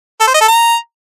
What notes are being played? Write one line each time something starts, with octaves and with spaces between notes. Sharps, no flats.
A4
C5
D#5
A4
A#5